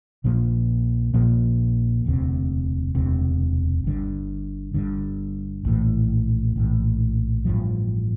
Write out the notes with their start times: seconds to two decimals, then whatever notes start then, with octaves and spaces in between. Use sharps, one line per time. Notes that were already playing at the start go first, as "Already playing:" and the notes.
0.24 A#1 A#2 F3 A#3
1.14 A#1 A#2 F3 A#3
2.05 E1 D2 C3
2.95 E1 D2 C3
3.84 G1 G2 D3
4.74 G1 G2 D3
5.65 A#1 A2 E3
6.56 A#1 A2 E3
7.45 A1 G2 F3